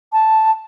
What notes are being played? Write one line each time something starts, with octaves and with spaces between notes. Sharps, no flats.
A5